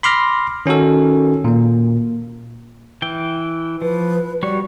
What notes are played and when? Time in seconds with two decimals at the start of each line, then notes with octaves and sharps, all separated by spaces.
0.03 B5 C6 D6 F6 A#6
0.66 D#3 C#4 D#4 F#4 A4
1.44 A#2 A#3
3.02 E3 G5
3.82 F3 B4
4.43 G3 F#4 C#5 D5